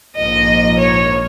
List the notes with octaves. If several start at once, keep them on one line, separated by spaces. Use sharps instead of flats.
A#1 G#2 F3 A#3 D#5
C#5